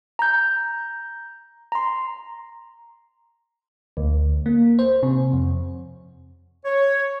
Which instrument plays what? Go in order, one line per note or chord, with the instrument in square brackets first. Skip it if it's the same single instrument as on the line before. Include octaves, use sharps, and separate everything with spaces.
[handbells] A#5 G6
A#5 C6
[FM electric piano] D2
A#3
C5
C3
F2
[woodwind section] C#5